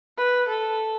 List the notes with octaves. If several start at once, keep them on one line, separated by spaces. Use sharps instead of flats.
B4
A4